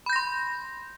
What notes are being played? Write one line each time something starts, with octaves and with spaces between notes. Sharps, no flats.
B5 C6 G6 A#6